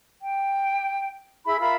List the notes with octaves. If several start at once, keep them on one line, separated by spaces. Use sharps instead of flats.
G5
E4 G#4 E5 B5
F4 A#4 E5 B5